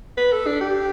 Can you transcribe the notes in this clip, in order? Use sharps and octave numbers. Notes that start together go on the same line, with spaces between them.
B4
A4
D4
G4